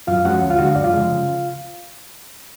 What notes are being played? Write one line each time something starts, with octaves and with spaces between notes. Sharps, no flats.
F#2 F4 F5
F3 G#3 C#4 F#4 F#5
D2
F4 F5
D3 G#3 D4 F#4 F#5
F5
F#2 D5
F4 F5
C#3 F3 G#3
C#3